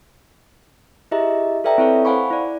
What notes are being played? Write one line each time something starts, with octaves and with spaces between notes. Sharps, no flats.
E4 G4 G#4 D#5 E5 A#5
A4 B4 D5 E5 G5 A#5
C4 E4 A4 B4 C#5
C5 F5 F#5 G#5 B5 C#6
E4 D5